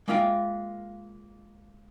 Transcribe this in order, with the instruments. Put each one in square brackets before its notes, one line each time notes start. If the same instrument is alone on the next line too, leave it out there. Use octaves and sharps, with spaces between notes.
[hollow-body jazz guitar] G#3 A#3 E4 F4 E5 G5